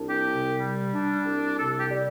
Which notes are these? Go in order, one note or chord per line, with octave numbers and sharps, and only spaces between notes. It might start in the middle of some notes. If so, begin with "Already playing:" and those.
Already playing: C2 D4
G4
C3
G3
D4
C2
C3 A4
G4
G3